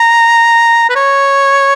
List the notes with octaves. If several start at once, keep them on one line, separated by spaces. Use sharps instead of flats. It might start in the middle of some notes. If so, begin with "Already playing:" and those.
Already playing: A#5
B4
C#5